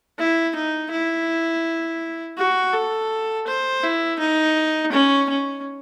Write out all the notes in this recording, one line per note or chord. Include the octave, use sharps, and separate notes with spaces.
E4
D#4
E4
F#4
A4
C5
E4
D#4
C#4
C#4